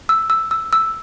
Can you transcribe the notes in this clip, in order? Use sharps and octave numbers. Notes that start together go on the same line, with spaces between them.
E6
E6
E6
E6